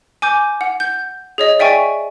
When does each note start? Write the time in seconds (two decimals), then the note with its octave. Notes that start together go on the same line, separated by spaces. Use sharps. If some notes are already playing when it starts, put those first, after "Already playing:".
0.22 G#5 D6 G6
0.61 F#5
0.80 G6
1.38 G#4 C#5 D#5
1.59 D5 E5 G5 G#5 C#6